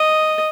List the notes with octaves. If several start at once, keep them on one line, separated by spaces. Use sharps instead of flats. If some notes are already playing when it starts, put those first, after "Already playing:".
Already playing: D#5